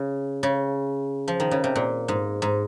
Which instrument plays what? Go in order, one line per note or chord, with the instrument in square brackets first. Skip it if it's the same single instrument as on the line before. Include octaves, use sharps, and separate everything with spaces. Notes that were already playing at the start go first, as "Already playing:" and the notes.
Already playing: [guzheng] C#3
C#3
F3
D#3
C#3
C3
A#2
G#2
G#2